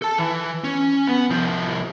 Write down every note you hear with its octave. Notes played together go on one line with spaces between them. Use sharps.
A4 A5
E3
C#4
B3
C2 F3